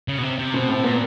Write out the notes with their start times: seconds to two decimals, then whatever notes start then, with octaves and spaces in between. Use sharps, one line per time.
0.08 C#3
0.18 B2
0.23 C3
0.39 C3
0.54 B2 C4
0.69 A2 C4
0.84 A#2 B3